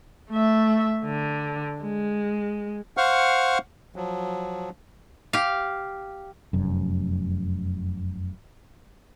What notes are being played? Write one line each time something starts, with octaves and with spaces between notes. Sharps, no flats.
A3 E5
D3
G#3
C5 F5 F#5 C#6 F6
F3 F#3
G4 F5
F1 F#2